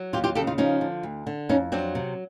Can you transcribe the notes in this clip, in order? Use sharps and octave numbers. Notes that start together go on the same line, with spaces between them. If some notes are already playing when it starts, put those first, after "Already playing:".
Already playing: F#3
D#2 F4 G4
F4 G4
C#3 G4 A4
D#4 F4
F3 C#4 D#4
D3
D2
D3
F2 C#4 D#4
F#3 C4 D4
C3